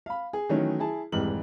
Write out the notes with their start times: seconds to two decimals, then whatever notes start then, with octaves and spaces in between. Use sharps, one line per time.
0.06 F5 B5
0.33 G#4
0.49 D#3 E3 F#3 A3 C#4 D#4
0.79 E4 G#4 A5
1.12 F1 G#2 E3 G3 G4 F#7